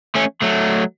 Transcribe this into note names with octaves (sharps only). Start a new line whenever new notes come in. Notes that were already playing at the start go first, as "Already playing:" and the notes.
A3 C#4
F#3 A3